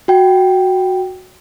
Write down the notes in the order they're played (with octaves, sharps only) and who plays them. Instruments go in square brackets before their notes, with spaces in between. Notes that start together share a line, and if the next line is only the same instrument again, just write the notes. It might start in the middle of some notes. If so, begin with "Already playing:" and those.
[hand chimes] F#4 G5